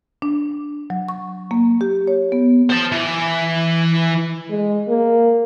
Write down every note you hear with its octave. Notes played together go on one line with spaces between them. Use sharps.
D4
F#3
C#6
A#3
G4
C#5
B3
C5 A5
E3
G#3
A#3